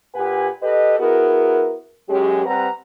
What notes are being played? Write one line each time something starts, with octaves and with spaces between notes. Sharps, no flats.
A#2 G4 B4 F#5 G#5
G4 A4 B4 D#5
B3 E4 F#4 G#4 A#4
F#2 F#3 G#3 C#4 G4
G3 C4 B4 F#5 A#5